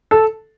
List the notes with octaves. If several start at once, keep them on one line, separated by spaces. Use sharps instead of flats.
A4